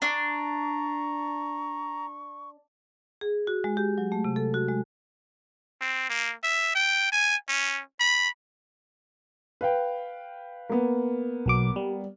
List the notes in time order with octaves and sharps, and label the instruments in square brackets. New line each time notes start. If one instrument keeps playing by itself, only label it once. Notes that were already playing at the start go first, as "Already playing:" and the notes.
[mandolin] D4 [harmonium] A#5 [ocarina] C#6
[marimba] G#4
F#4
G#3
G4
F#3
A3
C3
A4
F#4
G#3
[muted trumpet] C4
A#3
E5
G5
G#5
C#4
B5
[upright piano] B4 F5 G5
A#3 B3
[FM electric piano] B1 F#3 D6
G3